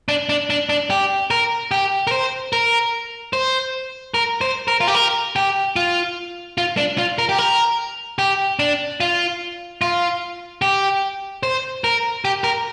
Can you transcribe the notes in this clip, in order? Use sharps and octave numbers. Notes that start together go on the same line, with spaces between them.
D4
D4
D4
D4
G4
A#4
G4
A#4
C5
A#4
C5
A#4
C5
A#4
F4
G4
A#4
G4
F4
F4
D4
F4
A#4
G4
A#4
G4
D4
F4
F4
G4
C5
A#4
G4
A#4